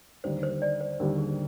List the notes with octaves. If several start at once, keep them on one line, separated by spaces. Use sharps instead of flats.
D#2 D3 G3 C5
C5
D5
C5
D#2 D3 G3 A#4
G#4